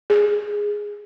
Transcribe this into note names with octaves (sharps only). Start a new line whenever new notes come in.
G#4